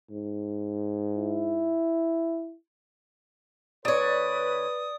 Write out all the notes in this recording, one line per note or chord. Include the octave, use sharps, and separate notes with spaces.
G#2
E4
D2 B4 C#5 D5 D#6